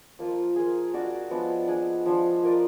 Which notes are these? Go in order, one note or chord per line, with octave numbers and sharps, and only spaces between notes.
F3 A#3 F4
A#3 F4 G#4
D4 F#4 D5 F5
F3 G#3 B3 D4
D4 G#4 D#5
F3 G#3 D4
A#3 F4 A#4 D5